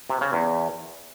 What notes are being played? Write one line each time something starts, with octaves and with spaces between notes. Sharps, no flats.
C3
C#3
E2